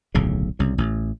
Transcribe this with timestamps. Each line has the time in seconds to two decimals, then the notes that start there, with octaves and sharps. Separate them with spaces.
0.14 D1 B1 A2 C#3
0.59 C2 C#3
0.78 A1